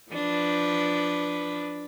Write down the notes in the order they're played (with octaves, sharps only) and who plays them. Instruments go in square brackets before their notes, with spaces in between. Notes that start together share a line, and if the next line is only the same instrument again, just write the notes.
[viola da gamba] F3 D4 B4